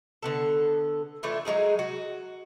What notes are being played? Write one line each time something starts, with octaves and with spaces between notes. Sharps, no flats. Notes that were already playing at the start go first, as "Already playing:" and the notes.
D3 B3 A4
E3 A3 D4 F4
F#3 G#3 D#4 G#4
F#4